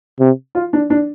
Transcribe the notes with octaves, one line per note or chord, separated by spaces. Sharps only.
C3
F4
D4
D4